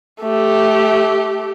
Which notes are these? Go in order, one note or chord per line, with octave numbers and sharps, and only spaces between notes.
A3 G4